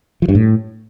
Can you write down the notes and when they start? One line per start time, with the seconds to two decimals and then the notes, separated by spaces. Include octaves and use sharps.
0.22 F3
0.29 G2
0.35 A2